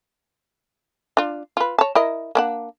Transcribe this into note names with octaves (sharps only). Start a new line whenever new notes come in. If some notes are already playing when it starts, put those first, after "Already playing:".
D4 F4
F4 B4
C#5 A5
E4 A#4 D#5
A#3 D4 F#5